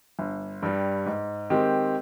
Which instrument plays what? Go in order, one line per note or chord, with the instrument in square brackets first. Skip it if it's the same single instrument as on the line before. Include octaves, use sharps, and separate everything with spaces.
[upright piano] G1
G2 G3
G#2
D#3 G#3 C4 G4